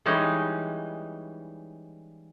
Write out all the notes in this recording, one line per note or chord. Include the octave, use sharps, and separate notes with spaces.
E3 G3 G#3 C#4 D#4